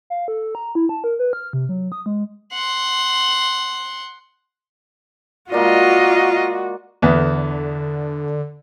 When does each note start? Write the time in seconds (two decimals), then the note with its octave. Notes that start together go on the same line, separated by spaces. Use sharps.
0.10 F5
0.28 A4
0.55 A#5
0.75 E4
0.89 A5
1.04 A#4
1.19 B4
1.33 F6
1.53 C3
1.69 F#3
1.92 D#6
2.06 G#3
2.53 F#5 C6
5.52 G#3 A#3 F4 F#4 D5 D#5
7.02 E2 D3 B3